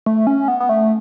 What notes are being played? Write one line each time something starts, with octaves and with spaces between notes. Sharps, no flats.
A3
C#4
B3
B3
A3